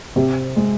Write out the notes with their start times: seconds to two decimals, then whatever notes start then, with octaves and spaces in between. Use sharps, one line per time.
0.16 C3
0.56 G#3